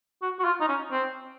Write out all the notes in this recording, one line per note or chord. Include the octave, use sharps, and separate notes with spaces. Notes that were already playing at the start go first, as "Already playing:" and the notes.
F#4
F#4
F4
D#4
C#4
C4